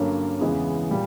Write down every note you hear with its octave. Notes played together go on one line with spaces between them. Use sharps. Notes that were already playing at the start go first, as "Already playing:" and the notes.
Already playing: G2 D3 F#3 A#3 C#4
E2 C#3 E3 G#3 B3
A#2 G3